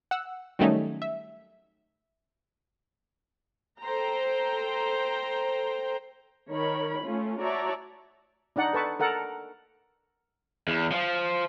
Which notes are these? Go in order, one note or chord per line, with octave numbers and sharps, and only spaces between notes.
F#5 E6
D#3 F#3 G3 A3 C#4 D#4
E5
A4 C5 G5 A#5
D#3 A#4 C#5 B5
A3 C#4 F4
F#4 C#5 D5 E5 A5 A#5
D4 D#4 D5 F#5
A4 B4 A5 C#6
A4 A#4 F#5 A5
E2
F3